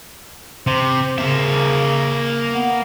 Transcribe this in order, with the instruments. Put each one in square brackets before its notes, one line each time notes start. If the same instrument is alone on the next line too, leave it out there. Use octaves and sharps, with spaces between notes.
[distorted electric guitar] C3 [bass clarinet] C5
[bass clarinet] C#3 [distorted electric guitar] A#3 E5
[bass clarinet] B3